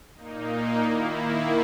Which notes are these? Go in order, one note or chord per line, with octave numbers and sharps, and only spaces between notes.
A#2 A#3 D#4
D#3 A#3 E4